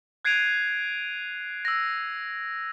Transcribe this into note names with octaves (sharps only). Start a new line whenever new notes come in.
F#6 G#6 C7 D7 D#7 F7
E6 A#6